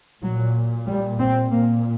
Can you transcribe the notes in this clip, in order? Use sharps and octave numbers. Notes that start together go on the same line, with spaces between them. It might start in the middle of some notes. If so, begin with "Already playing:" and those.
A#2 F#3
G3
C4
A#2 A#3